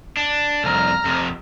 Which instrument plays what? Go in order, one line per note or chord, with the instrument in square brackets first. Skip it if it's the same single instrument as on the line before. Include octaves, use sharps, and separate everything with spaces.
[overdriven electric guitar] D4
[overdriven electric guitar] C2 F2 [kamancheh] A#5 F6
[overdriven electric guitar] F2 C3